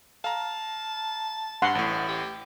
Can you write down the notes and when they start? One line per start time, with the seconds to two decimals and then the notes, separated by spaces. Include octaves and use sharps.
0.24 F5 A5 A#5
1.62 G2 F#5 C6
1.75 A1 A2
2.08 G4